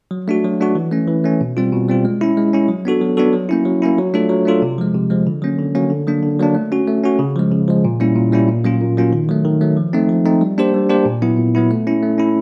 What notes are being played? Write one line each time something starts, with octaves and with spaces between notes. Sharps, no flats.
F#3
A3 D4 F#4
F#3
A3 D4 F#4
E3
A3 C#4
E3
A3 C#4
B2
G3 C4 F4
B2
G3 C4 F4
G#3
C#4 E4
G#3
C#4 E4
F#3
B3 D4 F#4 A4
F#3
B3 D4 F#4 A4
F#3
A#3 C#4 E4
F#3
A#3 C#4 E4
F#3
A3 D4 F4 A4
F#3
A3 D4 F4 A4
C3
F3 G#3
C3
F3 G#3
D3
F#3 A#3 C#4
D3
F#3 A#3 C#4
D3
F#3 A#3 D4
D3
F#3 A#3 D4
A3
C#4 F#4
A3
C#4 F#4
C#3
F3 G#3
C#3
F3 G#3
A#2
G3 A#3 C#4 E4
A#2
G3 A#3 C#4 E4
A#2
F#3 A#3 C#4 F4
A#2
F#3 A#3 C#4 F4
D#3
F#3 A3
D#3
F#3 A3
F3
A3 C4 D#4
F3
A3 C4 D#4
G3
A#3 D4 G4 C5
G3
A#3 D4 G4 C5
A#2
F#3 B3 E4
A#2
F#3 B3 E4
A3
C#4 E4
A3
C#4 E4